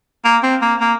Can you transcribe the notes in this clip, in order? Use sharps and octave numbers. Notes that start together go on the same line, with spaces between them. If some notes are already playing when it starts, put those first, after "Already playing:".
A#3
C4
A#3
A#3